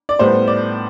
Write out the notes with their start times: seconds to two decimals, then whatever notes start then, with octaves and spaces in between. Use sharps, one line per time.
0.09 D5
0.19 A2 G3 B3 C5
0.48 D5